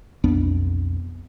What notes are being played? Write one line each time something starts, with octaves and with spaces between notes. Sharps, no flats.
B1 F2 B3 D4